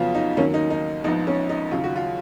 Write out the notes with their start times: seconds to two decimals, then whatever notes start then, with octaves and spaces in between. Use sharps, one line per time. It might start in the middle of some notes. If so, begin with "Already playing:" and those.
Already playing: F2 C#3 F#3 B3 F4
0.15 D#4
0.37 D#2 D#3 F#3 A#3 C#4
0.54 D#4
0.70 D#4
1.04 A#1 G#2 F3 B3 D#4
1.27 C#4
1.49 D#4
1.71 D#2 C#3 F#3 F4
1.84 F#4
1.96 F4